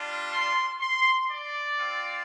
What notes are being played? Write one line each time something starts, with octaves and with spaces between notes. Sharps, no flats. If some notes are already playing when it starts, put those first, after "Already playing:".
Already playing: G3 D4 F4
C6
C6
D5
C4 F4